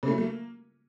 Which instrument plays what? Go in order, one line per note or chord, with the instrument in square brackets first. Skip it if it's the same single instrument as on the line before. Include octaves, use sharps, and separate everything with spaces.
[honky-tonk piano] C#3
A3
F#3
A3
A#3